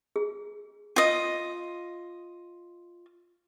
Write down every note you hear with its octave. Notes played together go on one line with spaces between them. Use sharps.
G#4
F4 D#5